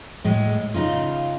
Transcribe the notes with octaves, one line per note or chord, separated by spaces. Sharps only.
A2 G#3
C#3 D#4 F4